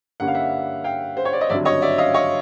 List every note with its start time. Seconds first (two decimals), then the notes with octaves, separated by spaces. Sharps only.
0.20 G2 D3 G3 A#3 C#4 F#5
0.28 F5
0.35 E5 F#5
0.84 F5 G5
1.17 C5
1.25 C#5
1.33 D5
1.41 D#5
1.49 G#1 G2 D3 F#3 D5 E5
1.65 C#5 D#5
1.82 D5 E5
1.98 D#5 F5
2.14 C#5 D#5